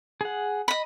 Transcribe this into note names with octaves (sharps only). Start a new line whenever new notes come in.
G#4 F#5
D#5 B5